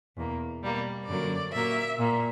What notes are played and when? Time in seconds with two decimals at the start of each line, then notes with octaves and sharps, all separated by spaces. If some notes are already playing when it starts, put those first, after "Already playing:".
0.17 E2 B2 A#3
0.62 B2 G3 A#3
1.07 F#2 D3 F#3 A#3 D5
1.53 A#2 F#3 A#3 E5
1.99 A#2 A#3